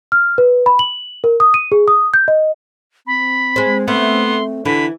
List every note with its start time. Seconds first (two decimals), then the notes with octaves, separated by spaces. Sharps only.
0.12 F6
0.38 B4
0.66 B5
0.79 F#7
1.24 A#4
1.40 D#6
1.54 D#7
1.72 G#4
1.88 D#6
2.14 G6
2.28 D#5
3.07 C4 B5
3.56 G#3 C5
3.88 A3 B3 C6
4.65 D3 E3 E4 B5